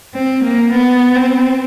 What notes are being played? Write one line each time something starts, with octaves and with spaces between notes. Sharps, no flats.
C4
A#3
B3
C4